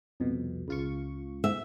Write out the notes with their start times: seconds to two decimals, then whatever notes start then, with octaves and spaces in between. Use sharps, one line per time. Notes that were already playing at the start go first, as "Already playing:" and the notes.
0.20 C2 F2 B2
0.68 C#2 F4 C#6
1.44 E5